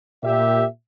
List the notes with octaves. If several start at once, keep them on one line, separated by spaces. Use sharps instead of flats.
A#2 G4 E5